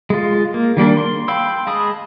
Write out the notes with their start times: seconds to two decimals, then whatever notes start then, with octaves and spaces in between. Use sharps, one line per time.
0.10 G#3 F4
0.54 A#3
0.77 D#3 G3 A#3 D4
0.97 C6
1.28 F5 G5 B5 C6 E6
1.67 G#3 A5 B5 D#6